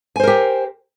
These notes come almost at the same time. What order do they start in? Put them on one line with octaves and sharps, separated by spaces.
G#5 C5 A#4 G4